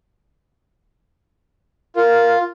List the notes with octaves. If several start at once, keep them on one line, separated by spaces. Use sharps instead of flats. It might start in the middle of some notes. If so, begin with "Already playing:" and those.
F4 A#4